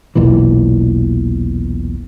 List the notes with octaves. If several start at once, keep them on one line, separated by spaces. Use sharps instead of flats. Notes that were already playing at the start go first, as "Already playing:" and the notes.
E1 B1 A#2 E3